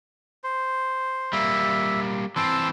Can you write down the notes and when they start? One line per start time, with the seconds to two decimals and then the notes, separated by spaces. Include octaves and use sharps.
0.44 C5
1.33 G3 A#3 E5
2.36 E3 C4 A5 C6 E6